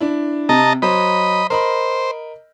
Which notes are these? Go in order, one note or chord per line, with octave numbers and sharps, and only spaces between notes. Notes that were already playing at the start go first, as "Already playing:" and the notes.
D4 E4
C3 D#5 A5 A#5
F#3 C5 D#5 B5
A#4 C5 D#5 B5